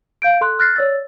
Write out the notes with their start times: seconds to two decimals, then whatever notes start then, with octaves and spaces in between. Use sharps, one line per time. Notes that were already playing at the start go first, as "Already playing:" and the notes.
0.22 F5 G6 D7
0.41 A4 C6 F#6
0.59 F6 F#6 A6 A#6 C7
0.76 C#5 D5 E6 A6